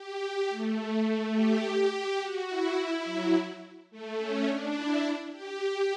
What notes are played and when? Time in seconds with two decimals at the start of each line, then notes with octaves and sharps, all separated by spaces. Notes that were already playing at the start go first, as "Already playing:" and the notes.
Already playing: G4
0.21 G4
0.49 A3
1.34 G4
1.91 G4
2.20 F#4
2.48 E4
3.05 F#3
3.91 A3
4.18 C#4
4.47 D4
4.75 E4
5.32 G4